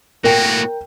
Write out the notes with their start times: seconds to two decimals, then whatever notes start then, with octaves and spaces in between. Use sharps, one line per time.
0.24 A2 A#3 F#4 A#4 G5